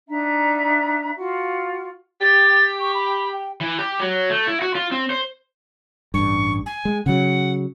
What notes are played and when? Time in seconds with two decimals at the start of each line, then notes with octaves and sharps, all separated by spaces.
0.08 D4 D#4 E5 A#5
1.17 F4 F#4
2.21 G4 A6
2.80 C#6
2.94 B5
3.33 G5
3.61 E3
3.79 G4
4.00 F#3
4.30 A3
4.47 E4
4.62 F#4
4.75 F4
4.92 C4
5.10 C5
6.14 A1 G2 C#6
6.66 G#5
6.85 G#3
7.06 C#3 F#3 F#5